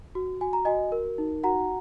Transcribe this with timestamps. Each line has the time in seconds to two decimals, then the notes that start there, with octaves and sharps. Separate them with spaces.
0.15 F#4
0.41 F#4 G#5
0.53 A#5
0.65 F#4 D#5 G#5
0.92 A#4
1.18 D#4
1.44 F#4 F#5 A#5